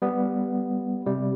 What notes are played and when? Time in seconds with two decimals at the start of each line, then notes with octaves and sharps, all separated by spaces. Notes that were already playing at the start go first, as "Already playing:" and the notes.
0.02 G3 B3
1.06 C3 G3